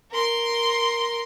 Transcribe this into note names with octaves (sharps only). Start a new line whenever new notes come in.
A#4 C6